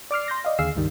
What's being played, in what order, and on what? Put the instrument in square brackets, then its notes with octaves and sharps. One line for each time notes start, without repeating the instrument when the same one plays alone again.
[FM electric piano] D5 D6 F6 C7
C6 G6 A#6
D5 D#5 F5
D#2 D3 G#4 F5 E6 C7
C#2 G2 D#3 G3